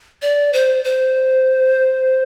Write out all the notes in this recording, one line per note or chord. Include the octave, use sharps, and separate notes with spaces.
D5
C5
C5